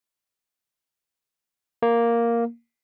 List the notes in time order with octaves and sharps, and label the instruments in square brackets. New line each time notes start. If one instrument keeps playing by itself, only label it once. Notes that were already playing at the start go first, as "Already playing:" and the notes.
[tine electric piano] A#3